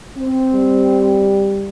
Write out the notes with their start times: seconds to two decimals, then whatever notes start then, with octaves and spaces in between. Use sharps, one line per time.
0.18 C4
0.54 G3